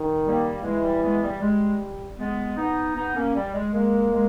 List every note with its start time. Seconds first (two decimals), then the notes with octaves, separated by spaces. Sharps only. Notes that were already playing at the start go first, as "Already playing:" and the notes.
Already playing: D#3
0.25 G3 A#3
0.64 E3 G#3
0.83 G3
1.03 G#3 B3
1.23 G3
1.41 G3 G#3
2.19 G#3 B3
2.57 B3 D#4
2.95 B3 D#4
3.16 A#3 C#4
3.35 G3
3.54 G#3
3.73 G#3 A#3
4.13 G#3